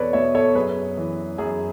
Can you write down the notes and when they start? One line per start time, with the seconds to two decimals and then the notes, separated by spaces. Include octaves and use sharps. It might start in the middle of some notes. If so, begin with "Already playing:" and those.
Already playing: E2 B2 A4 B4 C#5 D5
0.13 B2 C#5 E5
0.35 A4 C#5
0.55 F#2 G#4 B4
0.97 E3
1.38 F#2 G#4